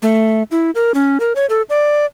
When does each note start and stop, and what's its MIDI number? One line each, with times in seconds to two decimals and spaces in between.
0.02 0.43 57
0.51 0.70 64
0.75 0.92 70
0.94 1.18 61
1.20 1.33 70
1.36 1.46 73
1.50 1.62 69
1.70 2.06 74